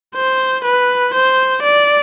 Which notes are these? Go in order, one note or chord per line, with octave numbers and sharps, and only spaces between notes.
C5
B4
C5
D5